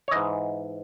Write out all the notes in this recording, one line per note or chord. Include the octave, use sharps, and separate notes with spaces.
C#5
G#2 E3 D#5